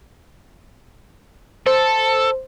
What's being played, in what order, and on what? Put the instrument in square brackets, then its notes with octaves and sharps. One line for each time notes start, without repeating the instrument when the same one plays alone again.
[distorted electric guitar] A4 [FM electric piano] C5